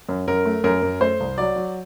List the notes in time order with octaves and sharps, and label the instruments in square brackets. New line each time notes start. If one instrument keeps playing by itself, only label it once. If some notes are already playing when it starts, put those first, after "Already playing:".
[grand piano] F#2
[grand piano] F#2 [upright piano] A#4
[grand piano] A3
[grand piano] F#2 [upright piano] A#4
[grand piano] F#2
[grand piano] A3 [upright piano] C5
[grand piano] C2
[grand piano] F#3 [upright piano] D5
[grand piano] F#3